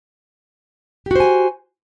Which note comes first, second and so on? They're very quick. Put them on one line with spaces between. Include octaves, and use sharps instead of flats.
G4 F#4 C5 G#5